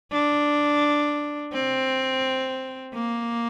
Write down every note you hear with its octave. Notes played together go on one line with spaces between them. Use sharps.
D4
C4
A#3